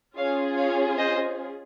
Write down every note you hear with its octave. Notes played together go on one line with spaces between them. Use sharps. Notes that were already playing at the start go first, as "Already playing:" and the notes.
C#4 F4 G#4 C#5 F5
C#5 F5
C5 D#5